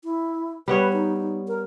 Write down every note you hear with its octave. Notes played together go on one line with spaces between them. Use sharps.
E4
G3 B3 B4 C#5
D#4
D#4
A#4